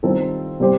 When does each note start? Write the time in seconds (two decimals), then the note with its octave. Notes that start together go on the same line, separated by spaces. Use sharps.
0.03 D#3 G3 C4 F4 A4
0.60 C3 G3 C4 G4 C5